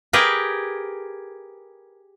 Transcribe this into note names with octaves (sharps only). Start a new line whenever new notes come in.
G4 G#4 A#4 B4